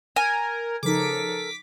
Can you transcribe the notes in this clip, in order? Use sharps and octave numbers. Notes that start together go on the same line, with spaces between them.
A#4 G#5
C#3 F3 D#4 A4 A#4 D6 B6